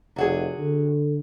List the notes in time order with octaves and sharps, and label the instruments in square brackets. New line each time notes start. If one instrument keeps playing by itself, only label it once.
[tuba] F1 [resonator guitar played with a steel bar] C3 F#4 G#4
[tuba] D3